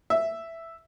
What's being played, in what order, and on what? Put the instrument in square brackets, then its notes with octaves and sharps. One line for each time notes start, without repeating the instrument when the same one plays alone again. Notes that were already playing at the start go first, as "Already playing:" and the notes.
[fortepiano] E5